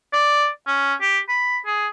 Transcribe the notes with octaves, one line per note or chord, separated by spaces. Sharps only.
D5
C#4
G4
B5
G#4